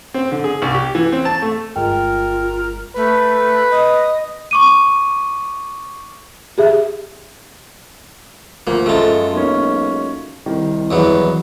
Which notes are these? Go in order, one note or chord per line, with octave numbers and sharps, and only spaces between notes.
C4
D3
G#4
C2
G4
E3
C4
A5
A3
G1 G#3 F4 A#4 G5
A3 B4
D#5
C#6 D6 D#7
G4 G#4 E5
D2 F3 A#3
F#2 G#3 A3 F4 A4
B1 G#3 A#3 C#4
C2 D#3
E2 F#3 B3